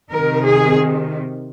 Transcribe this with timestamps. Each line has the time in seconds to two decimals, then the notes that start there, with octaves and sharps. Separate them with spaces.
0.12 C3 D#3 A#4
0.45 G#4